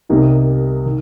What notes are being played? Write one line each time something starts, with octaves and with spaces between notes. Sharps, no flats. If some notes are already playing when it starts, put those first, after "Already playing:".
C2 C3 G3 A#3 D#4
D#3